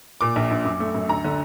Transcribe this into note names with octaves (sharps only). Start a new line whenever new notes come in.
A#2 D6
A#1
A#1
F#2
A3
F#2
D2 A#5
D3